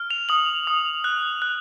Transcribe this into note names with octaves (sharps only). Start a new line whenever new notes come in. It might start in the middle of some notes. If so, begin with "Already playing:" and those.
Already playing: F6
F7
D#6 F#7
D#6
F#6
F#6